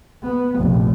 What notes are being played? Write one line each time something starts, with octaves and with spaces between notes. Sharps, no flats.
B3
F1 A#1